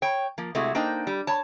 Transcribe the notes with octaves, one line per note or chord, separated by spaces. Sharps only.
C#5 G5
F3 A#3
C3 G#3 A3 E4 F#4
A#3 D4 D#4 C5 G5
G3
C#5 A5